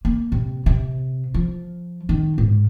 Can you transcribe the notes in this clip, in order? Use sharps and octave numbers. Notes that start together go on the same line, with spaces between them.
A#3
C3
C3
F3
D#3
G#2